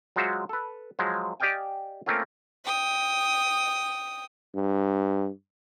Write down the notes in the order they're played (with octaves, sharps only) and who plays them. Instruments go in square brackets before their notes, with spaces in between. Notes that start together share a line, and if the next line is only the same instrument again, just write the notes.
[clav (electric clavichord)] F#3 G#3 F4 F#4 C5 E5
A4 B4
F3 F#3 G#3
G4 D5 D#5 F5 G5 G#5
A3 A#3 C4 C#4 F4
[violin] G5 D#6
[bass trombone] G2